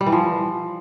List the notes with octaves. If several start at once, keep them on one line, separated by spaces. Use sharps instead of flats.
G3
E3
F3